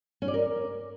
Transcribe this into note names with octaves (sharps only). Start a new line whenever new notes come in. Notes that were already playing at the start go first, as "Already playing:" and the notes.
C#4
D5
A#4